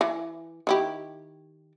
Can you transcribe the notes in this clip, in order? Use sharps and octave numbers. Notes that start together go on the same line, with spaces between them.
E3
D#3 E4 G4